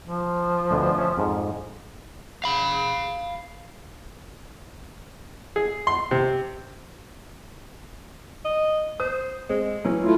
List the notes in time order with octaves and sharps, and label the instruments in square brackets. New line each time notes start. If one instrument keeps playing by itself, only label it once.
[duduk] F3
[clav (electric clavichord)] D2 B2 D3
C#4 E5
F2 G#2
[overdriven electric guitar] F5 B5
[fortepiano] G#4
C6
C3
[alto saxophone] D#5
[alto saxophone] C5 [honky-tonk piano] D#6
[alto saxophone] G#3 [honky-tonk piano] C4
[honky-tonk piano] E3 F#3 [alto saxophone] C#4
[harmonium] A3 E4 F4